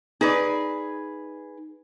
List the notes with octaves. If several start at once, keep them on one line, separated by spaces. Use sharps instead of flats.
D#4 G#4 B4 D5